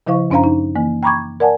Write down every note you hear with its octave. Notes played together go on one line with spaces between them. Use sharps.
C#3 F3 E4 C5 F5 C#6
F#2 C#4 D4 C5 F5 A#5
D#4
E3 A#3
G5 A#5 B5 C#6 D6 G#6
A#4 D5 F#5 G#5 A5